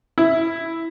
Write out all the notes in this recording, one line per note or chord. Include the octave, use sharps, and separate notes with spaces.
E4